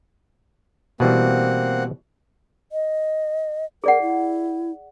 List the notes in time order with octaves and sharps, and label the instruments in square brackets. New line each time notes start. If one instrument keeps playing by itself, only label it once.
[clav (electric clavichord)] B2 E3 G3 [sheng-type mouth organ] A#3 C4 F#5
[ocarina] D#5
[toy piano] G#4 D5 F#5 [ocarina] A#4
[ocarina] E4